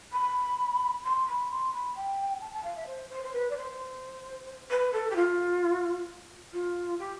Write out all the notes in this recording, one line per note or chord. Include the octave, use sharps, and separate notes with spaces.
B5
C6
B5
C6
B5
G5
A5
A5
F5
E5
C5
C5
C5
B4
D5
C5
B4
A4
G4
F4
F4
G4